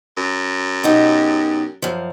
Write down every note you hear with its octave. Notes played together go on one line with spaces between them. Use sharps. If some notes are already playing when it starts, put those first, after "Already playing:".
F#2
B2 D#4 G4
F#2 F3